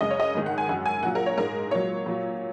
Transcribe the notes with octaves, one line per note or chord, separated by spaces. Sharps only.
F#2 C#3 G#3 D#5
C#5
D#5
G#2 D#3 G#3
F#5
G#5
F#2 F#3 F#5
G#5
A#2 F#3 F#5
A#4
C#5
G#2 G#3 A#4
A#2 F#3 C#5
A#2 F#3